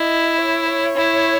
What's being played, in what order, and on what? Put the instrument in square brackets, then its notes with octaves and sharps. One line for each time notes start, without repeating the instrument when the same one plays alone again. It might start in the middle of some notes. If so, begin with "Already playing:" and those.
Already playing: [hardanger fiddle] E4 [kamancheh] D#5
[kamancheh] C#5
C#5
[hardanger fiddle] E4